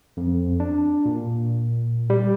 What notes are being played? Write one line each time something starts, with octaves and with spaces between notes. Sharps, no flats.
F2
D4
A#2
G3